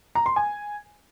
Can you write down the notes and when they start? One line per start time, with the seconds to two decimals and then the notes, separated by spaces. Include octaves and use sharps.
0.15 A#5
0.26 C6
0.36 G#5